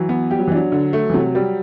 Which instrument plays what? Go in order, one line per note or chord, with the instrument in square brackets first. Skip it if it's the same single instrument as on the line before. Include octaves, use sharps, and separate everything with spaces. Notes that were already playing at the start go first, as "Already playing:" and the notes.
Already playing: [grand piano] E3 [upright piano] F#3
[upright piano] B3
[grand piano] G3 [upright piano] G4
[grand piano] F#3
E3
[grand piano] F#3 [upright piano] D4
[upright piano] D3
A3
[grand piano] E3
[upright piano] C3 [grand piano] F#3
[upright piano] G3